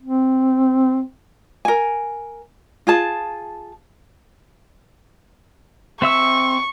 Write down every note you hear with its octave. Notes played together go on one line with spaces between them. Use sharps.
C4
A#4 G#5
F4 G#4 A5
C4 E5 C#6 E6